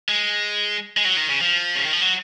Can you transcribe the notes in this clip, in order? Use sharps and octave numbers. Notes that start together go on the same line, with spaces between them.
G#3
G#3
F#3
D#3
C#3
F3
C#3
D#3
F3
F#3